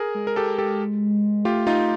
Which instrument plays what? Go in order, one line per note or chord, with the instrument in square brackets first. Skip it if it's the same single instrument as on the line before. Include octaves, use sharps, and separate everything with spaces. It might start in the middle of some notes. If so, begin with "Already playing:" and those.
Already playing: [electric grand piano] G#4 A#4
[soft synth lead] G#3
[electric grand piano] A#4
G4 A4
G4 A4
[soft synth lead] A3 [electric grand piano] F4 G4
[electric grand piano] D#4 F4